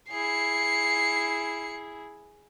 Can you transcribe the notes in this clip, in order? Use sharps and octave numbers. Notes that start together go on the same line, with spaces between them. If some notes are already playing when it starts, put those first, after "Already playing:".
E4 G#4 C7 C#7